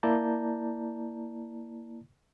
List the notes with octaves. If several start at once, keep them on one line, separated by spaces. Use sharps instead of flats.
A#3 E4 D5 A5 A#5 G6